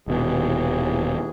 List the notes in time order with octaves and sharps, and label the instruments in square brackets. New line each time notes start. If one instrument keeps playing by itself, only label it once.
[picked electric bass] D#1 B2 [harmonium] D#2 E3 G#4